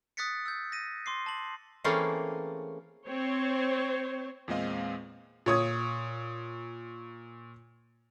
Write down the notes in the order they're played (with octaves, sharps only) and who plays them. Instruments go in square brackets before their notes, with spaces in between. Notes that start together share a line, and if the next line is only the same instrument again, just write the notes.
[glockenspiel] D#6 F#6 A6 B6 C#7
E6 G6
A#6 D#7
C6 D6 C7
A5 F#7
[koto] E3 A3 A#3 C4 C#4 G#4
[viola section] C4 C5 C#5
[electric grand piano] E2 A#2 G#3 C4 D#5 F5
[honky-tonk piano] A#2 C#5 D#6 G#6